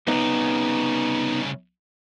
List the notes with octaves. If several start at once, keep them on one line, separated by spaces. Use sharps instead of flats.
C2 C#3 B3 D#4